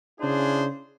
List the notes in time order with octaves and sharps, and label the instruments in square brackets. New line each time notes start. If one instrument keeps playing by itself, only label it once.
[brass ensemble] C#3 D4 E4 G#4 C5